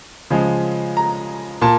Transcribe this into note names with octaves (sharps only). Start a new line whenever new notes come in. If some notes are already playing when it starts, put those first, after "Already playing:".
C#3 F3 G#3
A#5
A#2 A5